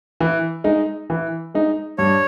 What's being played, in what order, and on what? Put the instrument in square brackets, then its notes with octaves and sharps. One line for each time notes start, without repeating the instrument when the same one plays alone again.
[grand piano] E3
G#3 D#4
E3
G#3 D#4
[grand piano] G2 [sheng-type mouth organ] C#5